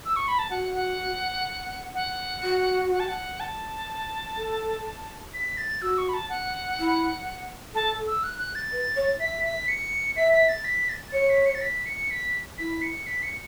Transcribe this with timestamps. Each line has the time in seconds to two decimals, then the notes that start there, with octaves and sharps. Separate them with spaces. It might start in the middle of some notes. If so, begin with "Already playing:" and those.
0.05 E6
0.16 C#6
0.28 B5
0.39 A5
0.50 F#4 F#5
0.75 F#5
1.94 F#5
2.43 F#4
2.91 F#5
3.00 A5
3.08 F#5
3.40 A5
4.37 A4
5.34 B6
5.57 A6
5.82 F#4 E6
5.98 C#6
6.09 B5
6.14 A5
6.30 F#5
6.79 E4
7.74 A4 A5
8.08 E6
8.24 F#6
8.39 F#6
8.55 A6
8.72 B4
8.96 C#5
9.20 E5 B6
9.44 B6
9.68 C#7
10.17 E5 B6
10.33 B6
10.49 A6
10.64 B6
10.89 A6
11.13 C#5 C#7
11.30 B6
11.46 C#7
11.55 A6
11.62 B6
11.86 C#7
12.11 B6
12.58 E4 B6
12.82 C#7
13.07 B6
13.23 C#7